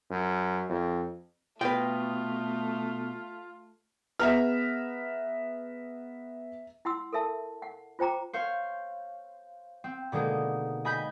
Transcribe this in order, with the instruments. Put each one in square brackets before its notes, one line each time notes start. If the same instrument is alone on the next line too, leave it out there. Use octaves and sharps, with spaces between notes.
[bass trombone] F#2
F2
[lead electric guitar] B2 [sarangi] A3 [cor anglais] F4 [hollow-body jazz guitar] B4 G5
[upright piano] B3 G#4 B4 [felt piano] E5 A#5 F6
[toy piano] E4 F#5 C6 E6
A4 A#4 E5 A5
F#5
F4 C5 G5 A#5 D6
[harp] C5 C#5 F5
C4
B2 D3 G#3 A#3 D#4
D#5 G#5 B5 G6 A#6 B6